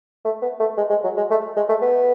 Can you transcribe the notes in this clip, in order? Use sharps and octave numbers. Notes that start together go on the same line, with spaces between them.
A3
B3
A3
G#3
G#3
F#3
G#3
A3
G#3
A3
B3